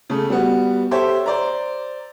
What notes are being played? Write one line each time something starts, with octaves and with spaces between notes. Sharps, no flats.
C#3 A3
G3 B3 F#4
G4 A4 C5 C#5 E5
C5 D5 A#5